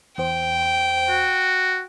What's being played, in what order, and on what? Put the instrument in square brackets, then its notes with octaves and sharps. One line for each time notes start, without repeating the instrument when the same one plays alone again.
[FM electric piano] E2 C5 [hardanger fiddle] G5
[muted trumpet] F#4